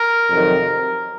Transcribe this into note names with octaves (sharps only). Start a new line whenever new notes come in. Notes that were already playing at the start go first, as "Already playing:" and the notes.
Already playing: A#4
F2 C3 D#3 F#3